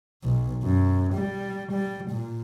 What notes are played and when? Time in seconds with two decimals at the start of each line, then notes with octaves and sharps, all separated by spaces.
0.23 B1
0.63 F#2
1.14 G3
1.72 G3
2.11 A#2